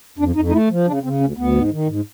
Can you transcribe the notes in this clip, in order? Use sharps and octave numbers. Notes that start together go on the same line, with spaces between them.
F2 D4
F2 D#4
D#4
A3 E4
F3
C#3 D4
C#3 C4
D2 C#4
D2 B3
G#2
D#3
G#2